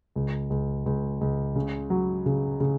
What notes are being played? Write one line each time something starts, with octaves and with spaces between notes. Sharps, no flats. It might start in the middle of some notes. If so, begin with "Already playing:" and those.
C#2
C#2
C#2
C#2
C#3
F#3
C#3
C#3